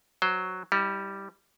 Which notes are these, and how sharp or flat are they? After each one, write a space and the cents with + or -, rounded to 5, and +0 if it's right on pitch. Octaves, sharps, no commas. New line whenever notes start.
F#3 +0 C5 +0
G3 +0 E4 -40